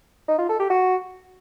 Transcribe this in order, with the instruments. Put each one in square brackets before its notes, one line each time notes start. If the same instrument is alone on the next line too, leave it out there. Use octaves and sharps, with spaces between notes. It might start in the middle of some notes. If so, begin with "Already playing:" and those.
[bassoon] D#4
F4
A4
G4
F#4